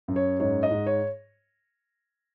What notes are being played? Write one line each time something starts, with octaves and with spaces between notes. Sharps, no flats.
F#2
C#5
G#2 C#5
D#5
G#2
C#5